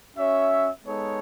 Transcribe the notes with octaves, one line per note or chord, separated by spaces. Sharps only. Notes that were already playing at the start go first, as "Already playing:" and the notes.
C#4 F#4 C#5 E5
G#3 B3 D#4 A4 C#5